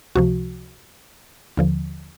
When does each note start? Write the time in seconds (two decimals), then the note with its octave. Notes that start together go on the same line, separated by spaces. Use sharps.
0.15 C#2 C3 F3 F#4
1.57 D#2 D3 F3